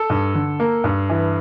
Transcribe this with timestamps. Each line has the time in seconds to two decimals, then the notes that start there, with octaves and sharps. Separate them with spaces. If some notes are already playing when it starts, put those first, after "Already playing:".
Already playing: A4
0.10 G2
0.34 D3
0.60 A#3
0.84 G2
1.09 E3